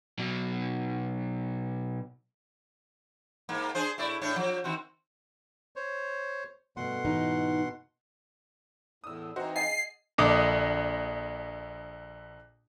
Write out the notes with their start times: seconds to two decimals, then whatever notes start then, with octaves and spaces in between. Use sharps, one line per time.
0.19 B2 F#3
3.49 G#2 A#3
3.75 D4 G#4 C5
3.98 A2 E4 D5
4.22 A2 D4 C#5
4.36 F3
4.64 D#3 C4 F#4
5.76 C5 C#5
6.77 G2 B2 A3 F#5 C6
7.05 G#2 E3 D#4
9.04 E2 A2 D#6 E6
9.36 E3 C4 D#4 F#4 C5 D#5
9.56 G#4 D#5 F5 F#5 G#5 C7
10.18 A#1 D3 D#5 D6 D#6